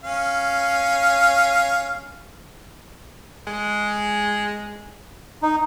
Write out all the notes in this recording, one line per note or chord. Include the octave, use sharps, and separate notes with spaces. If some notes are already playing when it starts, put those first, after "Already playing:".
C#4 F5
G#3
D#4